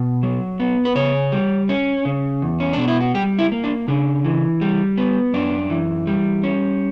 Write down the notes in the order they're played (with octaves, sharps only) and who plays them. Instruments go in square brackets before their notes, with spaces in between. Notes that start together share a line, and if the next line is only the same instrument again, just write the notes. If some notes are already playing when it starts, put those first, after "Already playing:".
Already playing: [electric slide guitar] B2
F#3
B3
B4
C#3 C#5
G3
C#4
C#3
E2
C#4
B2 D4
E4
F#4
G3 G4
E4
A#3
D4
C#3 D4
E3
G3
B3
F#2 D4
E3
G3
C#4